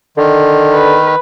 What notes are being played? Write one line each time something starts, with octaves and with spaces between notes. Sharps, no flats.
D3 D#3
B4